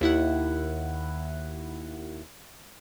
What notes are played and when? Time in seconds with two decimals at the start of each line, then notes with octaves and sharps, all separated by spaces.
0.01 D#2 E4 F#5